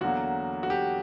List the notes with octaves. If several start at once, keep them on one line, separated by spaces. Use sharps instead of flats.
E2 D3 F#3 A#3 F#4
F#4
G4